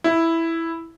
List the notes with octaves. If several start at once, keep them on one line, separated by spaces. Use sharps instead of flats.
E4